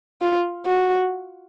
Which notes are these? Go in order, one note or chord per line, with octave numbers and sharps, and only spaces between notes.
F4
F#4